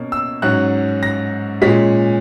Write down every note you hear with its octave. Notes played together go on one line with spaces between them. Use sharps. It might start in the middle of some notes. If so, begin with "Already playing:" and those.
Already playing: B2 A#3 C#4
E6
G#2 F#3 C#4 F#6
A#6
A#2 G#3 C#4 B6